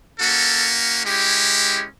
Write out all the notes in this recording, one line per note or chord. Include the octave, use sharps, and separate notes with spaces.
A#3 C#4 F#4 A4
G#3 C#4 E4 G4